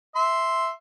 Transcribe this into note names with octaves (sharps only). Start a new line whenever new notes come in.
E5 C6